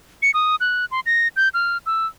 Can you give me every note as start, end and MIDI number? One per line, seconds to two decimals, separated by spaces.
0.22 0.31 97
0.34 0.56 87
0.60 0.85 90
0.91 1.00 84
1.06 1.28 94
1.36 1.49 91
1.54 1.78 89
1.86 2.06 88